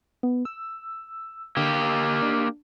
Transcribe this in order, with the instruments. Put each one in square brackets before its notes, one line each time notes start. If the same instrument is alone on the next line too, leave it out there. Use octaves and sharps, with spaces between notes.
[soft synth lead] B3
E6
[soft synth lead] D3 [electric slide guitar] A#3 G4
[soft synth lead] D4